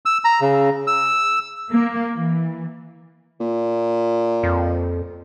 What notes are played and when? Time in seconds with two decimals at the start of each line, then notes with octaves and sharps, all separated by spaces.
0.06 E6
0.24 A#5
0.41 C#3
0.87 E6
1.71 A#3
2.14 E3
3.40 A#2
4.43 F2